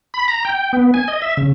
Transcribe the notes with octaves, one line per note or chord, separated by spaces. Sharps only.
B5
A#5
G5
B3
G#5
D#5
E5
C#3